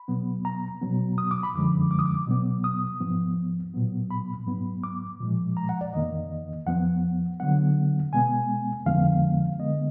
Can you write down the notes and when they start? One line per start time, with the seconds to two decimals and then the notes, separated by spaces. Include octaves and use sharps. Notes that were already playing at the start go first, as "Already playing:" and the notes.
Already playing: B5
0.08 B2 F#3 B3
0.45 A#5
0.82 B2 F#3 B3
1.18 D#6
1.31 D6
1.43 B5
1.54 F#2 D3 F3 G#3 D6
1.91 D6
1.99 D#6
2.06 D6
2.27 B2 F#3 B3
2.64 D#6
3.01 G#2 F3 B3
3.74 A#2 F#3 B3
4.11 B5
4.47 G#2 F#3 B3
4.84 D6
5.20 A#2 F3 G#3
5.57 A#5
5.69 F#5
5.81 D5
5.93 F2 D#3 A#3 D#5
6.67 F2 F3 B3 F#5
7.40 D3 F#3 B3 F#5
8.13 B2 G#3 B3 G#5
8.86 F2 D3 F3 G#3 B3 F5
9.59 D3 G#3 B3 D#5